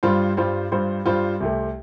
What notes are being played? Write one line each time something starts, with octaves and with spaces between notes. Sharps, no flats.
G2 G3 F4 C5
G2 G3 F4 C5
G2 G3 F4 C5
G2 G3 F4 C5
C2 C3 A3